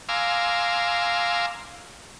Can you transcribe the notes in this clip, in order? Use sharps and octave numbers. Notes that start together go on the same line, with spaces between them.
F5 G#5 A#5 C6 D6 E6